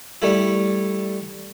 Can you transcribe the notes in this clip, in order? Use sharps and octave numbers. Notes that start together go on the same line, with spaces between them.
G3 A3 E4